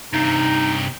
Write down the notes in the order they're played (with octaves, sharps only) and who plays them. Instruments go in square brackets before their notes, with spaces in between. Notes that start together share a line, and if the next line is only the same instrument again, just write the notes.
[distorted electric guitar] G2 C3 [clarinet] D#4